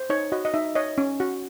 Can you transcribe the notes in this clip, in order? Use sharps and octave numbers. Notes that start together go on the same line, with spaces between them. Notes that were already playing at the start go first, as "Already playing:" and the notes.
Already playing: C5
D#4 C#5
F#4 D#5
D#5
D#4 E5
C#5 D#5
C#4
F#4